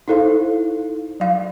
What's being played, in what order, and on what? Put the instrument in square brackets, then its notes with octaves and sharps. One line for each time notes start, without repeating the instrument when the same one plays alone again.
[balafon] D#4 E4 A4 C5 F5
F#3 F5